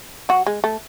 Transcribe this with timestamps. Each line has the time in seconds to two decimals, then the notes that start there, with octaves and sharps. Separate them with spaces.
0.29 F#3 F#4
0.46 G#3
0.64 A3